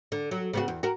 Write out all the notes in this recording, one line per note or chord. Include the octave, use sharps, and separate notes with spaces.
D3
F#3
C#3 B3 F#4
E2
F#4 A#4